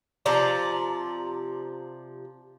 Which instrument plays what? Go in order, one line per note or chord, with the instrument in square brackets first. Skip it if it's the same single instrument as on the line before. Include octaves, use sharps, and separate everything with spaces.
[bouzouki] C3 F3 D5 A#5